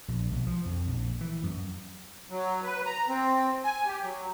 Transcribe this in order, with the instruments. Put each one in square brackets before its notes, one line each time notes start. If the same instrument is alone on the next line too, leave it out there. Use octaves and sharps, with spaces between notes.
[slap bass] A#1
B1
F3
F2
A#1
E3
F#2
[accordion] F#3
B4
A#5
C4
G#5
G4
F#3